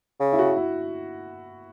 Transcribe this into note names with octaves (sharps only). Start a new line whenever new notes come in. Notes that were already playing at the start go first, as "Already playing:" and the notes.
C#3
E4
F#4
E4